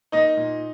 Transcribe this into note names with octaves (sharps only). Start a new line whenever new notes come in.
A#3 D#4 D#5
A#2